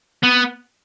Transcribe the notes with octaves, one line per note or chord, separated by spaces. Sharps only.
B3